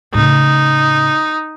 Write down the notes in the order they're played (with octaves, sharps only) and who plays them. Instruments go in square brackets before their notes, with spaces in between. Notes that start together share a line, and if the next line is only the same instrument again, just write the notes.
[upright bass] A2 C#3 [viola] D#4